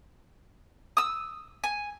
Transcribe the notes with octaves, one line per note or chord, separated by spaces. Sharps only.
D#6 E6
G#5